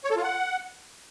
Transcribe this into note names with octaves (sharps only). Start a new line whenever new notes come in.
C#5
A4
F4
F#5